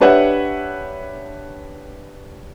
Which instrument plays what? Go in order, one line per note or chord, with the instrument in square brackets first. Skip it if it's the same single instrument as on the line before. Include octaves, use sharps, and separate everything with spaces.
[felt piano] D4 G4 B4 C#5 E5 F#5